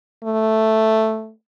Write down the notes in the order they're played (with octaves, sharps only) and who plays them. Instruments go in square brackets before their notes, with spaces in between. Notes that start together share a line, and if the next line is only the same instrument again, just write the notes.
[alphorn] A3